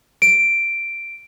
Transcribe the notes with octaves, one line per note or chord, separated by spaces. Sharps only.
D7